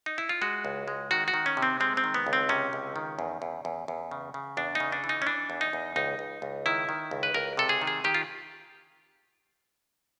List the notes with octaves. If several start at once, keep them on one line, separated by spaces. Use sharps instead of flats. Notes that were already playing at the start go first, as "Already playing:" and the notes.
D#4
E4
F4
G#3 F#4
C#2
G#3
D#3 F#4
F#4
D#3
C#4
C3
C4
G#3 C4
C4
D#3
B3
C#2
C4
C3 C#4
C#2
D#3
E2
E2
E2
E2
C#3
C#3
E2 D4
C#3 D#4
D4
E3
D#4
C#4
E3 D4
E2
D#4
E2
C#2 D#4
C#2
C#2
D#3 E4
D#3
C#2
B4
C#2 A#4
C3 A4
G#4
D#3
G#4
D#3 G4
F4